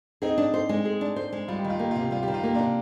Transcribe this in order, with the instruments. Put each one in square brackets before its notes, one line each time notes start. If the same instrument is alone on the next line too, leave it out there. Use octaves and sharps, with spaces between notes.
[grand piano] C4 D#4 [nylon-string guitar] G#4
[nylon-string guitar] D4
C5
G#3
G#4
D4
C5
G#3
[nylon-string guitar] G3 [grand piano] F4
[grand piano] G4
[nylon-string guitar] D#3
[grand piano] F4
[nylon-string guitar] A#3 [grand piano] G4
[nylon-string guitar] C3 [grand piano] F4
[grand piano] G4
[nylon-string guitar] G3 [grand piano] F4
[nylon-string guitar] D#3 [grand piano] G4
[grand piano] F4
[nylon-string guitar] A#3 [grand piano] G4
[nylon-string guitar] C3 [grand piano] D4 F4